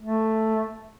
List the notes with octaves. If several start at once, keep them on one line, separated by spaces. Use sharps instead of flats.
A3